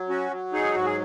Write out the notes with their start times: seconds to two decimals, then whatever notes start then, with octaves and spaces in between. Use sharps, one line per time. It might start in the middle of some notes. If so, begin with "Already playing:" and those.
Already playing: F#3
0.09 C#4 F#4
0.31 F#3
0.53 D#4 G#4
0.75 G#2 F#4
0.85 G#4